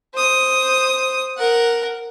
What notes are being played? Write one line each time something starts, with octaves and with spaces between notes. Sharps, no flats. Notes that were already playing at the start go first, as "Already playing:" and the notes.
C5 D#6
A#4 F#5